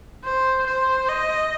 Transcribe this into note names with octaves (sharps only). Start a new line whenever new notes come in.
C5
C5
D#5